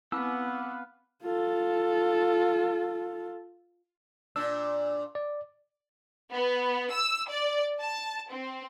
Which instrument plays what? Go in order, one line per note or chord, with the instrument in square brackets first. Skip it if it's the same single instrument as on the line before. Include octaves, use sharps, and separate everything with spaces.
[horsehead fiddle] B3 [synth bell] C4 D6 [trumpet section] B4 F5 F#5 [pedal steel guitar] E6
[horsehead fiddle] F4 A4
[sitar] A#2 D4 [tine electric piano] E6
[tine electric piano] D5
[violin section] B3
E6
D5
A5
C4